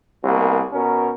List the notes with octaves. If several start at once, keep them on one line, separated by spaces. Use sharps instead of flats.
C2 B2 A#3
B2 C#4 A#4